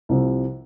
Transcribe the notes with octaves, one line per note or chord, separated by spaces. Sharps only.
C2 C3 F3